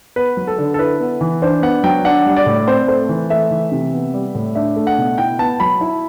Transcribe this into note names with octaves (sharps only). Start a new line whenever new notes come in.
B3 B4
F#3
A4
D3
A4
E4 B4
B3
E3
D4 C5
B3 F#5
F#3 G5
D4 F#5
G3
D5
A2
C4 C5
A3 C5
E3
A3 E5
E3
C3
B3
G3
A2
D4 E5
A3
F#5
B2
E4 G5
B3 A5
F#3 B5
E4